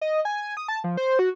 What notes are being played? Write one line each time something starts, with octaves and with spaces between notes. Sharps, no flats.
D#5
G#5
D#6
A5
F3
C5
F#4